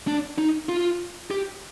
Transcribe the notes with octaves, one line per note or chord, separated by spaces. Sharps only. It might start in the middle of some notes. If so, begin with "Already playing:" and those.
D4
D#4
F4
G4